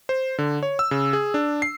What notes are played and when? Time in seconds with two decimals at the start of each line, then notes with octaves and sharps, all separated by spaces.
0.09 C5
0.38 D3
0.63 C#5
0.79 E6
0.91 C#3
1.13 G#4
1.34 D4
1.62 C7